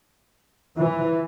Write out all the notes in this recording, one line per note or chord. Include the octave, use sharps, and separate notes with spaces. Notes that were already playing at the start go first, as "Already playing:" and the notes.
E3